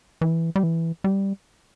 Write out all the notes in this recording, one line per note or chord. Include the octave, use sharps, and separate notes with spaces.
E3
G3
E3
G3